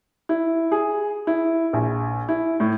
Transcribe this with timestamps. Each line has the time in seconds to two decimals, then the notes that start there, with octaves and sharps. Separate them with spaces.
0.29 E4
0.72 G#4
1.27 E4
1.73 A#1
2.29 E4
2.60 A2